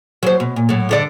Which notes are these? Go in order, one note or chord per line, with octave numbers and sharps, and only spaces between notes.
F#3 C5
B2
A#2
A2 F#3
G2 D3 D5